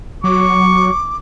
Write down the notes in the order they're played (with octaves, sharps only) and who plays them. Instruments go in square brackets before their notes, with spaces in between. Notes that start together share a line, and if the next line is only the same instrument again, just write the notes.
[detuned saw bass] F#3 [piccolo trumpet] C#6 [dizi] D6